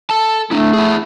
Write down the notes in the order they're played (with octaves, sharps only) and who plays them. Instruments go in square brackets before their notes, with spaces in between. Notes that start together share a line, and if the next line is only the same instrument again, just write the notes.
[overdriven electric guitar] A4 A5
[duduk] A3 [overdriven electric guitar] D4 E4
[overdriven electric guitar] E4 G#4